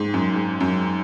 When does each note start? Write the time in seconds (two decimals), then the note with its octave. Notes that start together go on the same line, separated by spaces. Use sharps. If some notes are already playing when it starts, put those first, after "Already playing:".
Already playing: G#2
0.14 F#2
0.33 G#2
0.61 F#2